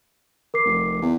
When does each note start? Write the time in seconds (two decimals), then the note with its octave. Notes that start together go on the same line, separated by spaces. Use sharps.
0.54 A#4 D6 C7
0.65 F1
1.02 E2